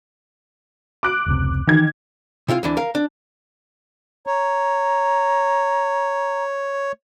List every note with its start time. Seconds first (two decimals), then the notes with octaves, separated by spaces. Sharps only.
1.03 D6 F#6 D7
1.26 F1 C#2 C3
1.67 D#3 E3 G#6
2.48 C3 E4 F4 F5
2.63 D2 E3 D4
2.77 A#4 F5
2.95 D4
4.27 C#5 A#5